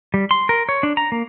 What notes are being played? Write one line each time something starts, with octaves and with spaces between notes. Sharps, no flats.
G3
C6
A#4
C#5
D4
A#5
A#3